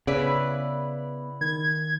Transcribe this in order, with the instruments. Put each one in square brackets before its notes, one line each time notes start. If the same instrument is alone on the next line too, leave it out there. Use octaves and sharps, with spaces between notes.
[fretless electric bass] C#3 [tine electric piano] B3 [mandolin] E4 B4 D5
[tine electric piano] D#3 [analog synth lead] G#6